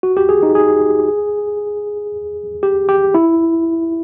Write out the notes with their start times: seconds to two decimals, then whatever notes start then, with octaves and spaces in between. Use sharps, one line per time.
0.03 F#4
0.17 G4
0.29 G#4
0.43 D#4
0.55 G#4
2.63 G4
2.89 G4
3.14 E4